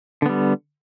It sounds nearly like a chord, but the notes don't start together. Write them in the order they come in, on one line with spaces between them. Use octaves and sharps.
D3 B3 G3